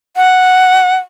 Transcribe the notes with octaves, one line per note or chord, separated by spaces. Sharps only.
F#5